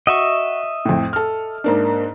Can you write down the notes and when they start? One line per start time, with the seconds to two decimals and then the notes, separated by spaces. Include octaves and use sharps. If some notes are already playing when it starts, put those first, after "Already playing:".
0.07 F#4 D#5 E5 C#6
0.85 F2 A2
1.13 A4 F6
1.64 G#2 A#3 D4